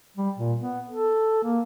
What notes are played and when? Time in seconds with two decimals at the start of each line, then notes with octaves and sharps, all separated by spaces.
0.17 G3
0.38 A#2
0.61 B3
0.90 A4
1.44 A#3